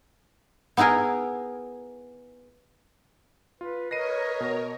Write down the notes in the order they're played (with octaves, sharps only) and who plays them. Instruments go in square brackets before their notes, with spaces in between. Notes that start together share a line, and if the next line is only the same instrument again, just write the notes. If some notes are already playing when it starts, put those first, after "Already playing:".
[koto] B3 D#4 E4 G#4 A#4
[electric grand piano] F4 [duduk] B4
[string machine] A#4 C#5 [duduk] B4 [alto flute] D#5 [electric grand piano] A#6 C7 D#7
[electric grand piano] B2 A#6